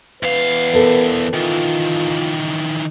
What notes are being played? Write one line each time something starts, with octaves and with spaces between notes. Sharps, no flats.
E2 B4 F5
B3 A4 A#4
D#3 E3 F4